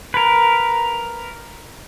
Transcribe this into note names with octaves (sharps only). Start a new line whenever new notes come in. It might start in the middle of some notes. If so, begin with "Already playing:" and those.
A#4 B4